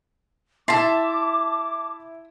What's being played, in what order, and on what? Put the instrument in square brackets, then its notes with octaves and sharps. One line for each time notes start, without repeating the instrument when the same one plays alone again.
[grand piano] E4 [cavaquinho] E5 C6 [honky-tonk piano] A5 A6 B6 [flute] D6